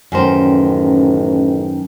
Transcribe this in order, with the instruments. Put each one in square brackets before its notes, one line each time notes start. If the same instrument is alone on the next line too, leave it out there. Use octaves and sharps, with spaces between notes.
[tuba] A1 [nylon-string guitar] F#2 D#3 C5